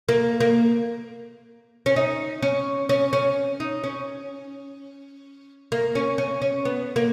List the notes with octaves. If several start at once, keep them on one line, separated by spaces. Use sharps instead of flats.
A#3
A#3
C#4
D#4
C#4
C#4
C#4
D#4
C#4
A#3
C#4
C#4
C#4
B3
A#3